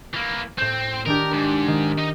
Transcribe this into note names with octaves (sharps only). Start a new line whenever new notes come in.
E3 A#3
A2 C4 G6
D#3 D4 G4 A#4
G#2
D#3
D#4 D#5